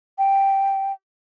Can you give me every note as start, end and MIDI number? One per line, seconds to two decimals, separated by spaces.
0.18 0.92 79